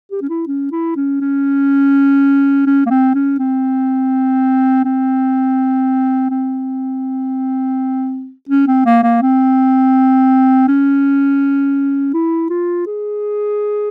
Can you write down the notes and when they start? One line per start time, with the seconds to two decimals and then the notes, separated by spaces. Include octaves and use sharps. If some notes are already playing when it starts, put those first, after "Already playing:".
0.11 G4
0.22 C#4
0.30 E4
0.47 C#4
0.72 E4
0.96 C#4
1.21 C#4
2.66 C#4
2.86 A#3
2.90 C4
3.14 C#4
3.39 C4
4.85 C4
6.30 C4
8.49 C#4
8.67 C4
8.86 A#3
9.03 A#3
9.22 C4
10.68 C#4
12.14 E4
12.50 F4
12.87 G#4